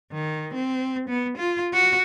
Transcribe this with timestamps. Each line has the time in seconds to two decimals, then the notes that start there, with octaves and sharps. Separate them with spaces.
0.13 D#3
0.54 C4
1.09 B3
1.38 F4
1.73 F#4